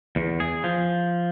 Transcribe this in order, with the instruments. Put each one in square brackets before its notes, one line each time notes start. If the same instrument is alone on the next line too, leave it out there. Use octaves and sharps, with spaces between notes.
[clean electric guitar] E2
G#4
F3